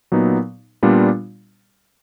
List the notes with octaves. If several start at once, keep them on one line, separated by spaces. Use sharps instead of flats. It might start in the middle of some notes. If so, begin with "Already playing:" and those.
A#2 F#3 B3 D#4
A#2 G3 B3 D4 F4